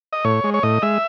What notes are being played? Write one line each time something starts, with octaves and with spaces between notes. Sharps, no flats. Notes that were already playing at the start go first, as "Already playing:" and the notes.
D#5
A2 C#5
G#3
C#5
A2 D#5
G#3 E5